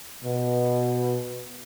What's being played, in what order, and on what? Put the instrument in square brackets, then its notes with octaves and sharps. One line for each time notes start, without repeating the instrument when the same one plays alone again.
[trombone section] B2